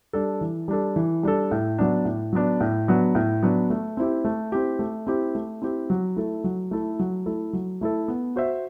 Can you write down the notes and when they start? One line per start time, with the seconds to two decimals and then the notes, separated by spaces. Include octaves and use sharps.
0.13 G3 D4 A4
0.41 E3
0.68 G3 D4 A4
0.96 E3
1.23 G3 D4 A4
1.51 A2
1.78 F#3 B3 D4
2.05 A2
2.33 F#3 B3 D4
2.60 A2
2.88 F#3 B3 D4
3.15 A2
3.43 F#3 B3 D4
3.70 A3
3.97 C4 E4 G4
4.25 A3
4.52 C4 E4 G4
4.79 A3
5.07 C4 E4 G4
5.35 A3
5.62 C4 E4 G4
5.90 F#3
6.17 A3 E4 A4
6.44 F#3
6.71 A3 E4 A4
6.99 F#3
7.26 A3 E4 A4
7.53 F#3
7.81 A3 E4 A4
8.08 B3
8.36 F#4 C5 E5